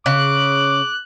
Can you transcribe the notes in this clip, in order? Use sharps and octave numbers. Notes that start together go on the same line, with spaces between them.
C#3 D6 F#6